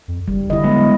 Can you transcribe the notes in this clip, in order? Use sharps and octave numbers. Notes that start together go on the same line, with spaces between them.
F2
F#1 G3
D3 E4 D#5
F#3 G#3 B3